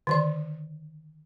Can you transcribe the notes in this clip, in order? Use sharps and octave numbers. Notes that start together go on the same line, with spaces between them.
D3 D#3 D5